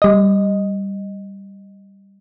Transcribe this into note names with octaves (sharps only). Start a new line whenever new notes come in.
G3 D#5